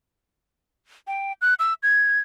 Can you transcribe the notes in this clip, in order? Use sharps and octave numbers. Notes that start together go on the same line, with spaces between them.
G5
F#6
E6
G#6